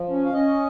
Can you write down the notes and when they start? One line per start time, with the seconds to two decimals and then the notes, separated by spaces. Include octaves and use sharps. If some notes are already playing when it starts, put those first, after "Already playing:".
Already playing: F3
0.10 C#4
0.25 F5
0.33 C#4 D#5